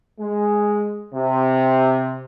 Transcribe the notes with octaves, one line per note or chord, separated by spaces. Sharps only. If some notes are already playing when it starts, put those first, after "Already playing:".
G#3
C3